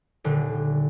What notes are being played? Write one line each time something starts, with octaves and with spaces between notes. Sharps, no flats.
D#1 D3